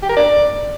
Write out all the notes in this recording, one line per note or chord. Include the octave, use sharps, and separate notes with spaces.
G4
A#4
D5